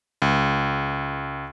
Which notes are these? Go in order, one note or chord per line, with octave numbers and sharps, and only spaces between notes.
C#2